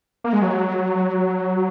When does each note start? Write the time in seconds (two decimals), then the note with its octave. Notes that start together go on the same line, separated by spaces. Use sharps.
0.24 A#3
0.33 G#3
0.42 F#3